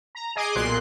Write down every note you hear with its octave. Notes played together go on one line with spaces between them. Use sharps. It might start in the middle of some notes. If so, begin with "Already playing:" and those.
A#5
G#4 D#5 D6 G#6 C7
B1 A#2 C6 F#6 C7